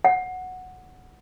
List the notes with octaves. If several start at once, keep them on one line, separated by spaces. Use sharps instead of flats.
F#5